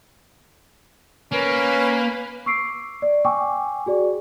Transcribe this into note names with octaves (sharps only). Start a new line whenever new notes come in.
A#3 C#4 B4
C#6 D6 E6 C7 D7
D5
G5 G#5 C#6 D6 E6
F#4 G#4 D5